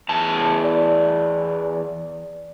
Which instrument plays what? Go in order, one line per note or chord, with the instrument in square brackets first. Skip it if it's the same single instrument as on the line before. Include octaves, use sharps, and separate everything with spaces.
[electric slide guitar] E2 A5
[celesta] D5